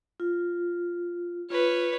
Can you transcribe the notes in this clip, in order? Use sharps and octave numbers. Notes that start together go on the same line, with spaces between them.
F4
F4 B4 C#5